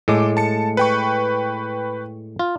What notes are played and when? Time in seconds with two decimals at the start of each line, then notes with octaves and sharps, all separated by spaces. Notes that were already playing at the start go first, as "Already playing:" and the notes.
0.08 A2 G#3 A4 D6
0.37 A5 C#7
0.77 B4 G5 C#6
2.39 F4